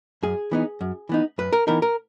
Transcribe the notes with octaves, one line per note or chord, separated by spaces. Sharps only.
F#2 G#4
E3 B3 D#4
F#2
E3 B3 D#4
F#2 B4
A#4
E3 B3 D#4 A#4
A#4